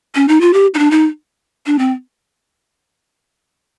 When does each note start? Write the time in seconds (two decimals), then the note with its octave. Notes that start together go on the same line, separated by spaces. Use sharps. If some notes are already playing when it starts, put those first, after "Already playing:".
0.15 C#4
0.28 D#4
0.41 F4
0.53 G4
0.74 D#4
0.79 D4
0.91 D#4
1.66 D4
1.79 C4